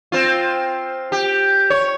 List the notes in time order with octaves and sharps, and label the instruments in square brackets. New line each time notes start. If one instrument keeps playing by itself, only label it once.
[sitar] C4 F4
G4
C#5